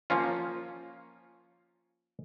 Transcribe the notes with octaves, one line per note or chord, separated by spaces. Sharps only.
F3 A#3 C#4 F4